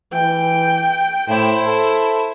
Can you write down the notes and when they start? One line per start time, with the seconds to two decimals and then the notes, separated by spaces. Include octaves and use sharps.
0.13 E3 G5
1.28 A2 E4 C5
1.66 A4